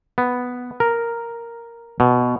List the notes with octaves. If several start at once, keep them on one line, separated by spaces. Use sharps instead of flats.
B3
A#4
B2